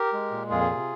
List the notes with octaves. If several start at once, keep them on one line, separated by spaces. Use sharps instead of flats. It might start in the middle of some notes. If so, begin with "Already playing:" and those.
Already playing: G4 A#4
G#3
A#2
F2 F4 G#4
C3